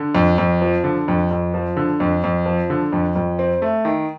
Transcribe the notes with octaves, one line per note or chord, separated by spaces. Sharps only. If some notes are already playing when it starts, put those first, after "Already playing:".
Already playing: D3
F2
F2
F3
D3
F2
F2
F3
D3
F2
F2
F3
D3
F2
F2
C4
A3
D#3